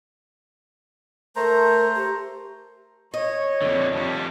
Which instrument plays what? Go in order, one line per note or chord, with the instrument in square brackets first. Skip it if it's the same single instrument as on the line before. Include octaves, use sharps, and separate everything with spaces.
[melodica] A3 C5 A#5 [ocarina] A#4
[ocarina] G4
[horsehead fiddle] C#5 [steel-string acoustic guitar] D#5
[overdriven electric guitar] F2 D3
F2 G3